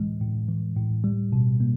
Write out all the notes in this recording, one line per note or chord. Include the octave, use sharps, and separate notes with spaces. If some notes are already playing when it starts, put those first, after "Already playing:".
Already playing: A2 E3 G#3
A2
E3
A2
G3
B2
A#3